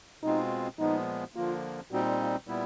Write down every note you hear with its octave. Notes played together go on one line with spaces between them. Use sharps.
B2 G#3 C4 D#4 F4
A#2 F3 G#3 B3 D#4
D3 F3 A#3 F4
A#2 G3 C4 D#4 F#4
F4
A#2 G3 B3 E4